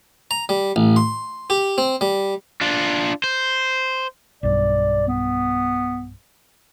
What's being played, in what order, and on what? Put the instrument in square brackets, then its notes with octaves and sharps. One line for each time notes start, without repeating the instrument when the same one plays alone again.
[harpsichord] A#5
G3
A1
C6
G4
C4
G3
[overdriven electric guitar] D4 F4
C5
[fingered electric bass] B1 G2 [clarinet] D5
[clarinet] B3